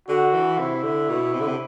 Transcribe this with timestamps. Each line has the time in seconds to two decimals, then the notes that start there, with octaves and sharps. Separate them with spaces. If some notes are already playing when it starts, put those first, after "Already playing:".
0.08 D3 F#4
0.33 E3
0.58 C3 E4
0.83 D3
1.08 B2
1.33 C3
1.40 D3
1.47 C3